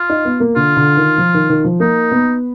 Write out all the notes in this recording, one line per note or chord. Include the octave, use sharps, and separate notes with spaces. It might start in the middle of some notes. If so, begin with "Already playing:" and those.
Already playing: F4
D#4
B3
A#3
D3 F4
D3
D#3
F3
D#3
D#3
F3
A#3 D#4
B3